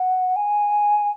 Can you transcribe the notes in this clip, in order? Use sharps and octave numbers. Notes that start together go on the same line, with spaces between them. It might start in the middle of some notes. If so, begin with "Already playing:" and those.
Already playing: F#5
G#5